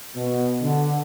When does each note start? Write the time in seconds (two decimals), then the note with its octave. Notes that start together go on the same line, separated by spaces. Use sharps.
0.15 B2
0.61 D3